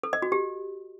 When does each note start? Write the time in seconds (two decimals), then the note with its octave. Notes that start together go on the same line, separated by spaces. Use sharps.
0.03 A4
0.13 D#5
0.22 F#4
0.32 G4